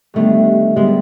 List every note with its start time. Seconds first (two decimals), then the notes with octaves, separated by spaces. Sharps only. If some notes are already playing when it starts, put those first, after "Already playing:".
0.14 D#2 D3 G3 A3 B3 D4
0.76 D3 G3 G#3 B3 D4